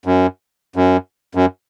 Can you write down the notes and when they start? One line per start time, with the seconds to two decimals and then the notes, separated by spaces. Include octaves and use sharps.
0.06 F#2
0.76 F#2
1.35 F#2